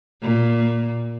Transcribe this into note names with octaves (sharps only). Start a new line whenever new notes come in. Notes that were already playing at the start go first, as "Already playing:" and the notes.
A#2